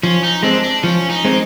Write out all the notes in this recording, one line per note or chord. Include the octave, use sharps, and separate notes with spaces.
F3 C#4
D#4
G#3 C4 D4
D4
F3 C#4
D#4
G#3 C4